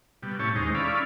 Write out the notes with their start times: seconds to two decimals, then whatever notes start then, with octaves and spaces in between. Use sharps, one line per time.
0.23 B2 G3
0.39 A2 C#4 E4 G4 C#5 A5
0.56 D#2 G#3 D#4 C5
0.75 C#4 E4 A4 D5 F5 B5